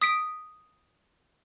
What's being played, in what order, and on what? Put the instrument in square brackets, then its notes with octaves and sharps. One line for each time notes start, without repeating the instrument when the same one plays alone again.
[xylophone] D#6 B6 D7